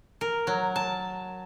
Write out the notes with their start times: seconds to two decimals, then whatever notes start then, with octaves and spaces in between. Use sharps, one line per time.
0.21 A#4
0.47 F#3
0.76 A5